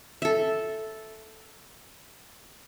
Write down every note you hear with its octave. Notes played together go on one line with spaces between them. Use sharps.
A4 E5